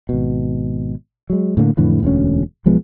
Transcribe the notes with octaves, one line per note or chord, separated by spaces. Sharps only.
G#1 B2
F#3 G#3
A2 D3 A3 A#3
F2 A2 D3 E3
E1 D2 B3 C#4
B1 F3 G#3 B3